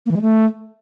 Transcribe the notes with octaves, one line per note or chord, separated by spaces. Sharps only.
A#3
E3
G#3
A3